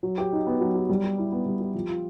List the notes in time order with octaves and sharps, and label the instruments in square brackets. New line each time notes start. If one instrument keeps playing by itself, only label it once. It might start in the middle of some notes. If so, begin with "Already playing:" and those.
[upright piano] F#3
G4
D#4
B3
F#3
G4
G3
G4
E4
B3
G3
G4
F3
F4